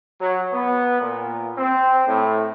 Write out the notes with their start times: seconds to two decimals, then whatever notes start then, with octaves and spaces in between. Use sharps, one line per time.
0.18 F#3
0.53 B3
1.00 A#2
1.57 C4
2.06 A2